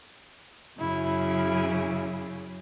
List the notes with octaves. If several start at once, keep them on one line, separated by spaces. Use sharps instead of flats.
F#2 C#3 E4